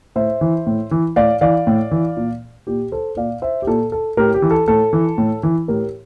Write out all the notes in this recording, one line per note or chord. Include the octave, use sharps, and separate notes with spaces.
A2 C5 E5
E3
A2
E3
A2 D5 F5
E3 D5 F5
A2
E3
A#2
A#2 G4
A4 C5
A#2 D5 F5
C5 E5
G4
A#2 A4
A4
A2 G4 A#4
G4
E3
A4
A2 A4
E3
A2
E3
A2 G4 A#4